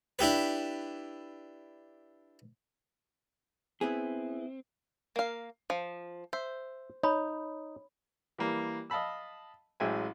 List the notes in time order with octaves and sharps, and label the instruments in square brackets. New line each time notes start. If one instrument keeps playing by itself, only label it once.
[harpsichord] D4 E4 G4 B4
[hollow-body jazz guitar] B3 E4 G#4 [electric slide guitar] C4
[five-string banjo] A#3 F5
F3
[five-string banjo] C5 [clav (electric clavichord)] E5
[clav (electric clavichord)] D#4 [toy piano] C#5 B5
[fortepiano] E3 G3 A#3
D#5 F5 A5 B5 E6
A1 F#3 G#3 E5 G5 G#5